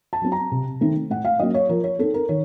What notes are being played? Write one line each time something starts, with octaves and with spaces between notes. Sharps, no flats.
A5
F#3 C4
A#5
C3
D#3 A3 C4 D#4
A2 F#5
F5
F#3 A#3 C#4 D#5
C#5
F3 A#4
C#5
C4 D#4 A4
A#4
D#3 C#5